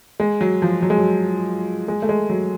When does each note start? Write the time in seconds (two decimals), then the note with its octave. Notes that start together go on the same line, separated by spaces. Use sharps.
0.20 G#3
0.41 F#3
0.62 F3
0.82 F#3
0.90 G#3
0.98 F#3
1.88 G#3
2.02 A3
2.09 G#3
2.29 F#3